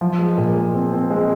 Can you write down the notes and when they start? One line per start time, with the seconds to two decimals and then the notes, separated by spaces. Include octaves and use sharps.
0.01 F3
0.19 G#3
0.38 A#2
0.56 G#3
0.74 C4
0.92 C4
1.11 G#3